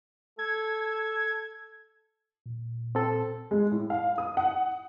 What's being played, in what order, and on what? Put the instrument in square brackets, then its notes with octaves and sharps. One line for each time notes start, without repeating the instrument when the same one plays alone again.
[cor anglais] A4 [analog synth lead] G#6
[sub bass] A#2
[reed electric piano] C4 A4
[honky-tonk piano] G#3
A2
F5
D#6
F#5